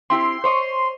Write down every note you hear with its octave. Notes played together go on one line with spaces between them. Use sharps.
C4 E4 G4 C6
C5 C#5 D#5